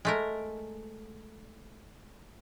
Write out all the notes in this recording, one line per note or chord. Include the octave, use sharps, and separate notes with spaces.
G#3 A3 A#4